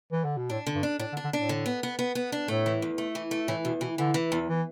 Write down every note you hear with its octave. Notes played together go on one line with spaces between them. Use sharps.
E3
D3
B2
A2 D4
D3
G2
D4
A2 D4
D3
D4
D3
A2 D4
D3
B3
B3
B3
B3
D4
A2 A3
E3
E2
A3
E3
A3
A2 E3
E2 B2
B2 E3
D3 E3
E3
E2
E3